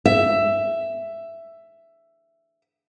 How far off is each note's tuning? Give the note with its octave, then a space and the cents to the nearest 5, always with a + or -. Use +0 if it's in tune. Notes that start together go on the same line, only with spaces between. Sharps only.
E5 +10